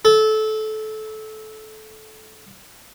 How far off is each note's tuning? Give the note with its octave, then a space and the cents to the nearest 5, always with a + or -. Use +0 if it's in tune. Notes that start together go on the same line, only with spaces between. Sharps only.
A4 -20